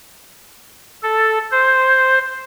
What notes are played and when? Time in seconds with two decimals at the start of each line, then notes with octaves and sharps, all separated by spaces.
1.03 A4
1.51 C5